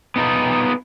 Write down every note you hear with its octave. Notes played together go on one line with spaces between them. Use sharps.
B3 D#4 F4 D#5